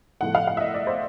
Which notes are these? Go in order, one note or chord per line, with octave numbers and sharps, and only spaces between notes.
A2 F3 A3 F#5
F5
F5
E5
D#5
D5
C5